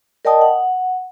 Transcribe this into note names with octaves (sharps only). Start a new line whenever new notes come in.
A#4 D5 D#5 G5 A5 D#6
F#5